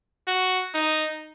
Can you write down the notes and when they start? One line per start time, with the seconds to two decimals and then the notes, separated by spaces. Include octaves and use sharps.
0.28 F#4
0.74 D#4